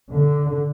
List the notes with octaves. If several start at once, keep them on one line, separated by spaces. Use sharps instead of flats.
D3